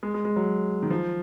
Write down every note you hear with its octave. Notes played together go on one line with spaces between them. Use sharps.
G#3
G#3
G#3
F#3
D#3
F3